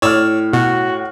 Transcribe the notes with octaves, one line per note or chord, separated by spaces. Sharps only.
A2 C#5 D5 E6 F6
B2 F#4